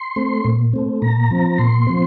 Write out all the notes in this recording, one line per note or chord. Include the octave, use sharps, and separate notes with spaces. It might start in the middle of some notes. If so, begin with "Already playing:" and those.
Already playing: C6
A3 C4
A#2
A3 C4
A#2 A#5
F3 C4
A#2 C6
F3 C4